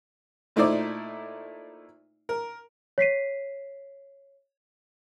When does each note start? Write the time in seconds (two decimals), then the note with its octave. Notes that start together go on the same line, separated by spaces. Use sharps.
0.56 A#2 A3 D#4 E4 C5 D5
2.29 A#4
2.98 C#5 B6 C7 D#7